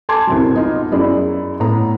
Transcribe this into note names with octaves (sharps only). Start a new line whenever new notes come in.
A4 G#5 A5 C6 D6 G#6
C2 C3 F#3
B3 D#4 F4
F#2 F#3 E4 G#4 D5
A2 B3 A#5